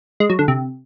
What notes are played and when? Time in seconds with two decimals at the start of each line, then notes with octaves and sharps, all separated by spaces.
0.20 G#3
0.30 F#3
0.39 D3
0.48 C3